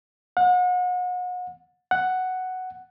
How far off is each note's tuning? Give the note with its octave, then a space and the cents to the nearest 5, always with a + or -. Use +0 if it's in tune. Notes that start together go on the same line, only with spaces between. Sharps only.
F#5 -35
F#5 +5